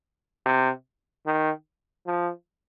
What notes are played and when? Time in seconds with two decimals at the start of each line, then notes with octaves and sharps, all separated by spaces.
0.45 C3
1.26 D#3
2.06 F3